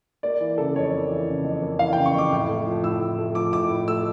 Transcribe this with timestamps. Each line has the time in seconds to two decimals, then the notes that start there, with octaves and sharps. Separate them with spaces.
0.23 A#3 D5
0.40 E3
0.58 C#3 A4
0.75 F2 C#5
0.93 A#3
1.10 E3
1.27 C#3
1.44 F2
1.62 A#3
1.79 E3 F5
1.93 C#3 G5
2.06 C#6
2.14 F2 D6
2.32 A2
2.49 A3
2.67 F3
2.84 A2 E6
3.01 A2
3.18 A3
3.35 F3 D6
3.53 A2 D6
3.70 A2
3.88 A3 E6